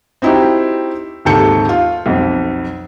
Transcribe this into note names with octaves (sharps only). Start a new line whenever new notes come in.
C4 D#4 E4 F#4 G4
D#2 G#2 C3 A4 G6 C#7
F4
B1 F2